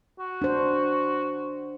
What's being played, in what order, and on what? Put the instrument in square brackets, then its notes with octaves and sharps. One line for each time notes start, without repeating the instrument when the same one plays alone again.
[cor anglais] F#4
[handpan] D4 C5